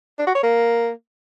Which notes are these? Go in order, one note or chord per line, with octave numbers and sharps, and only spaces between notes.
D4
F#4
C#5
A#3